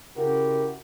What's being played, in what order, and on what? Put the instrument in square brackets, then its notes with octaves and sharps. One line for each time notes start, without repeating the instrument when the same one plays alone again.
[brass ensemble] C#3 E4 F#4 G4 A#4